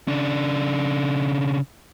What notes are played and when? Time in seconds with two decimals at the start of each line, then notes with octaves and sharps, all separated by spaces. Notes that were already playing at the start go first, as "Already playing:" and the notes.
0.08 C#3 D4